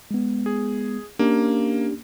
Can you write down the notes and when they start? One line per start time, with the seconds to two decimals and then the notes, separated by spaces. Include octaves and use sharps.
0.11 G#3 B3
0.46 G#4
1.19 A#3 C#4 D4 G4